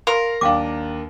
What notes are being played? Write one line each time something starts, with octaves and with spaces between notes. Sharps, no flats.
A#4 F5 C6
D#2 D4 F5 G5 D6